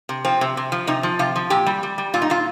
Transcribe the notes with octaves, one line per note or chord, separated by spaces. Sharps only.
C3
F3 C4
C3
C3
F3
C3 D#4
F3
C3 F4
F3
A#2 G4
G3
G3
G3
A#2 F4
D#4
A#2 F4